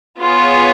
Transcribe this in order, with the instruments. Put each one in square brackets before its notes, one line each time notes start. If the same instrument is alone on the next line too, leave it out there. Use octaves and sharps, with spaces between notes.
[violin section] B3 F4 G#4 C#5